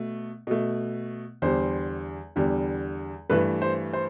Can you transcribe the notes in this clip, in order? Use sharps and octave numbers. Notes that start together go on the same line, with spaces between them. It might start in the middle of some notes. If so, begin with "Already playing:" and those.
Already playing: B2 A3
B2 A3
E2 D3 G3 C5
E2 D3 G3
G2 E3 A3 B4
C5
C5